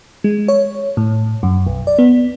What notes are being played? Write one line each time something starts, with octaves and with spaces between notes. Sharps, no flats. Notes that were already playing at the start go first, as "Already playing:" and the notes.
G#3
C#5
A2
F#2
B1
D5
B3